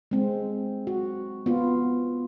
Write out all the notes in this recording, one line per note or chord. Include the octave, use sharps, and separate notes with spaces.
G#3 C4
F#4
B3 F4